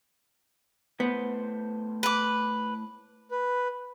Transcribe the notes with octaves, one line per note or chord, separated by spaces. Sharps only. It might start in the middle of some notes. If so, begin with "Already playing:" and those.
A2 B3 C5
B4 D6
B4